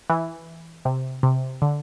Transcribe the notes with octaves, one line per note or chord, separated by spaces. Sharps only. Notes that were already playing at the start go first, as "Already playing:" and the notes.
E3
C3
C3
D3